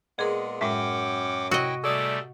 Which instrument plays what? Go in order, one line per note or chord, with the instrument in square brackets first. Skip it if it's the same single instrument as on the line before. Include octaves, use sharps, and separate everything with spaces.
[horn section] A#2 G#3 B3 [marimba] G#4 A#4
[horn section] F#2 [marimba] A2 G#3 E5 [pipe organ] F#5 G5 D6
[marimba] C3 [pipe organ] E4 G5 [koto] F#4 D#5
[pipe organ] C3 G3 A3 [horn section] G#4 A4 D5 [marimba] D6 D#6